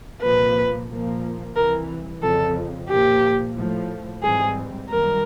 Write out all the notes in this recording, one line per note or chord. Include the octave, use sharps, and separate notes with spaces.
C2 A#2 F3 A#3 B4
A#2 F3 A#3
C2 C3 E3 A#4
F2 C#3 F3 A4
A#2 F3 A#3 G4
A2 F3 A3
G#2 E3 G3 C4 G#4
F#2 D#3 G3 A#3 A#4